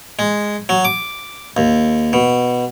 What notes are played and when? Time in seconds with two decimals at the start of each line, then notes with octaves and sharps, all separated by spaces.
0.19 G#3
0.69 F#3
0.85 D6
1.57 D#2
2.13 B2